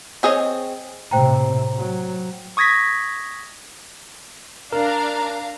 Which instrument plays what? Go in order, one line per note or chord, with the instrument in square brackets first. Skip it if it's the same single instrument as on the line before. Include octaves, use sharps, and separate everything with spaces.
[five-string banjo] C4 G#4 C#5 D#5
[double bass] A2 C3 [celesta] C5 G5 A#5
[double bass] F#3
[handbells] C#6 D#6 G#6 A#6 B6
[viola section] D4 [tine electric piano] A#4 [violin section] F5 A#5